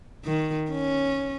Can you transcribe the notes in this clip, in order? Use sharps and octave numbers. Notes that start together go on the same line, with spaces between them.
D#3
C#4